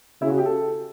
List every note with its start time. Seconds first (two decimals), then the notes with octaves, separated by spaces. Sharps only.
0.22 C#3 E4
0.30 F#4
0.38 G4
0.46 A4